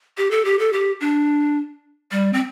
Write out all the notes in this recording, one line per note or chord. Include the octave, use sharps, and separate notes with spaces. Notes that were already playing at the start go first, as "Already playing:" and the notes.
G4
A4
G4
A4
G4
D4
G3
C4